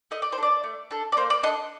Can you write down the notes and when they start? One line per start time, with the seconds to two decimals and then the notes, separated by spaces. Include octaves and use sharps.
0.11 A3 D#5
0.22 D5
0.32 C5
0.38 D4 A4
0.43 D5
0.64 A3
0.91 D4 A4
1.12 D5
1.17 A#3 C5
1.30 D5
1.43 D4 A4 D#5